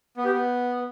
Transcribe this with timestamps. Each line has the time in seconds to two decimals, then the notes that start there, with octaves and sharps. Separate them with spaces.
0.17 B3
0.25 G4
0.33 B3